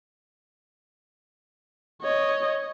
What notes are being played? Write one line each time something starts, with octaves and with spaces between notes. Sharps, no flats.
C#5 D#5